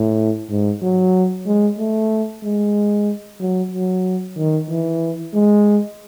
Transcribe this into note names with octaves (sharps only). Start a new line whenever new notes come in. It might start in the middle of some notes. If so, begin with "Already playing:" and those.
Already playing: A2
G#2
F#3
G#3
A3
G#3
F#3
F#3
D#3
E3
G#3